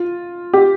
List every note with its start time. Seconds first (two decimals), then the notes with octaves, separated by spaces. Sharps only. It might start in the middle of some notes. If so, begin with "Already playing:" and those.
Already playing: F4
0.53 G4